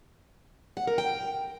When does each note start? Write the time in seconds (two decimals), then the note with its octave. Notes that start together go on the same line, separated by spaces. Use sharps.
0.77 F#5
0.87 A#4
0.98 G5